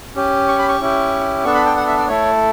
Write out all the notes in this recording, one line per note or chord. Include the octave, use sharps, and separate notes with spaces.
C#4 G4
C#6
B5
C#6
C#4 E4 G4
B3 D4 A4 C#6
B5
G5
F#5
E5
D5
A3 E4 A4 C#5